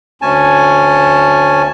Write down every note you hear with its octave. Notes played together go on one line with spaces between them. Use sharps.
D2 C#4 G#5 A5